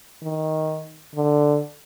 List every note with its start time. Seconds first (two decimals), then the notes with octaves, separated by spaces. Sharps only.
0.23 D#3
1.15 D3